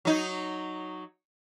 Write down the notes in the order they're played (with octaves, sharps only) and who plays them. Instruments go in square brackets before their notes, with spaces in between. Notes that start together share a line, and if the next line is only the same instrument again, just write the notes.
[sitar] F#3 D#4